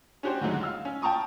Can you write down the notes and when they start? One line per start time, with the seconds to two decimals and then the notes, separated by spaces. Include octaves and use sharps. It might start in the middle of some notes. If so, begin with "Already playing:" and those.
0.23 C#4 D4 F#4 G4 C5 C#5
0.41 D#2 G#2 D3 F#3 G#3
0.61 F5 E6 F6
0.85 C#4
1.02 G5 A5 A#5 C#6 D#6